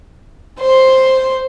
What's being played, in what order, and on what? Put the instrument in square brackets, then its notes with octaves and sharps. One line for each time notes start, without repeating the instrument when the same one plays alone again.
[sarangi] C5 [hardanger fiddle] C6